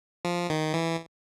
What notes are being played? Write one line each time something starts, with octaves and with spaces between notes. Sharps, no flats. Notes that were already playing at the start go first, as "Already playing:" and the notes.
F3
D#3
E3